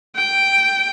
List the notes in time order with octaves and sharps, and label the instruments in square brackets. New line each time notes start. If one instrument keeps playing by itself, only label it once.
[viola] G5